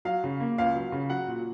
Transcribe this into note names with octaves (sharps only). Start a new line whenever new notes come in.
F#3 F5
C#3
A#3
C#2 F5
F#3
C#3
F#3 F#5
A#2